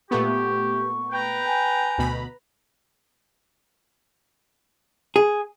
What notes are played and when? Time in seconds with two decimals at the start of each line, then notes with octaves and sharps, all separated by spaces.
0.11 A#2 A3 B3 G4 C#6
1.12 B4 G5 A#5
1.47 G#5
1.98 D2 B2 B5
5.16 G#4